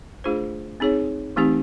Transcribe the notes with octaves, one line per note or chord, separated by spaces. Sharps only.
A3 D4 F4 G#4 C5
C4 D#4 G#4 C#5
E3 A3 C4 D#4 G4